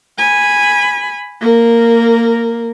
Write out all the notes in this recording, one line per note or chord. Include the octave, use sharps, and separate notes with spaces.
G#5 B5
A#3 A#4